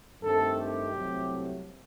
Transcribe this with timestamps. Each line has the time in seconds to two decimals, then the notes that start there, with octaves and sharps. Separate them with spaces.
0.23 G2 D#3 A3 C4 A4
0.57 G4
0.92 C2 C3 F#3 A3 C4